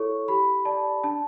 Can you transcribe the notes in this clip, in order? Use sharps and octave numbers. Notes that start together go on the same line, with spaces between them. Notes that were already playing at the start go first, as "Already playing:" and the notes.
Already playing: E4 A4 C#5 C#6
G4 B5
D5 A5
D4 A5